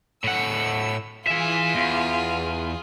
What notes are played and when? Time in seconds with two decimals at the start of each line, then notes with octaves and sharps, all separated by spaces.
0.24 A2 F#5 E6
1.27 E3 F4 G#4 E5
1.75 E2